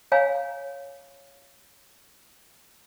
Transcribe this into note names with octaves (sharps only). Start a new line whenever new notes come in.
C#5 F5 G#5 A#5